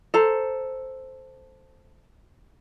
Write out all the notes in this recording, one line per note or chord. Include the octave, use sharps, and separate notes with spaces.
A4 C5 A#5